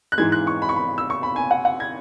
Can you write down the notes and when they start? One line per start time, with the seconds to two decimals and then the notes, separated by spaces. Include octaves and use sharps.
0.12 F#6
0.18 G#2 E3 G#3 G#6
0.32 F#6
0.47 C#6
0.62 B5
0.69 C#6
0.76 B5
0.98 E6
1.10 C#6
1.23 B5
1.36 G#5
1.51 F#5
1.65 F#5
1.80 G#6